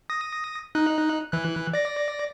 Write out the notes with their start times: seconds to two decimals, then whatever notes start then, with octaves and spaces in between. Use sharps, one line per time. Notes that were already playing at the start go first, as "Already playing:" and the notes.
0.10 D#6 A#6
0.75 D#4 F#6
1.32 E3 F#6
1.73 D5 A#6